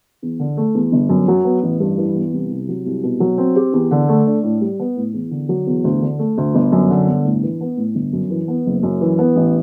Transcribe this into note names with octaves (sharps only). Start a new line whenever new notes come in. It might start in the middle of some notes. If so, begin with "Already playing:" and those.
E2
D3
A3
E2
G1
F#2
F#3
B3
A1
G2
E3
B3
C2
C3
F#3
C2
B2
F#3
C4
G4
E2
D3
A3
D4
A2
G3
B3
A2
E2
D3
F#3
E2
D2
D3
A3
D2
G1
F#2
D3
G1
A2
E3
B3
A2
G1
F#2
E3
B3
F#1
F#2
E3
B3
A1